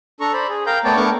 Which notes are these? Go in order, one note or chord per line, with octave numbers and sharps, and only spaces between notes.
D4 A4 A#5 C#6
C5 D5 B5
G#4
A#4 F5 G5 A#5 G6
A3 B3 C#5 D5 G5 A5
A3 B3 D4 A#4 C#6 D6